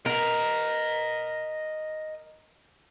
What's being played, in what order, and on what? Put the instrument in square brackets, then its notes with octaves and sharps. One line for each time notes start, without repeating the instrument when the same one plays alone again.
[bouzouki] A#4 [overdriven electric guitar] D#5 F#5